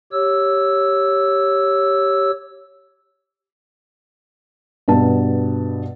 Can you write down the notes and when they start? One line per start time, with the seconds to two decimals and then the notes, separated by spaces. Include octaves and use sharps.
0.12 G4 C#5 E6
4.88 G2 B2 A5